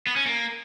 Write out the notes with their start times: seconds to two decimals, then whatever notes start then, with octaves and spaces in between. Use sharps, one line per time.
0.07 B3
0.16 C#4
0.26 A#3